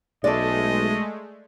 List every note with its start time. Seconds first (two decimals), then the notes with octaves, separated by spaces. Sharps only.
0.24 B1 G#3 A3 A4 D5 D#5